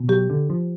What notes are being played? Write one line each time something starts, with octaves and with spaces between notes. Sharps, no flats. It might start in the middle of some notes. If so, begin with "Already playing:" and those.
Already playing: B2
F#3 G4
D3
F3